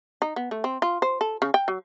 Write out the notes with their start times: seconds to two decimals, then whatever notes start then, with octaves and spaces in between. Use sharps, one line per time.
0.22 D#4
0.36 B3
0.51 A3
0.64 C4
0.82 F4
1.02 C5
1.21 A4
1.42 C#3
1.54 G5
1.68 F#3